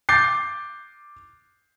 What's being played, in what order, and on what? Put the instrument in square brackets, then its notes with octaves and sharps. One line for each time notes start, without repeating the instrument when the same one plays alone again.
[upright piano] D6 G6 A6 C7